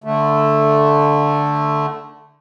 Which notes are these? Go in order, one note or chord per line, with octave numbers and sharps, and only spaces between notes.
D3 A3